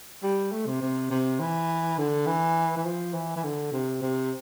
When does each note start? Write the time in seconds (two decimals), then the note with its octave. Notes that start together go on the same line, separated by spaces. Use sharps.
0.23 G3
0.52 A3
0.66 C3
0.82 C3
1.10 C3
1.40 E3
1.98 D3
2.27 E3
2.77 E3
2.86 F3
3.14 E3
3.36 E3
3.44 D3
3.72 C3
4.02 C3